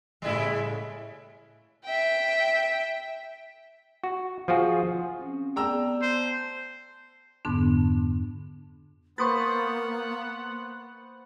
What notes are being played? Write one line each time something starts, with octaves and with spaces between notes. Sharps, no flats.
A2 C#3 G3 G#3 E4
E5 G5
F#4
F3 F4 F#4 G#4
C4 C#4
B3 D5 G5 A5 A#5 E6
C5
F2 G#2 D3 B3 D4
A#3 B3 B4 C5 F#5 C#6 D#6 A6